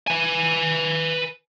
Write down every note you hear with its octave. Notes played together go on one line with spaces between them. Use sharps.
B4 G#5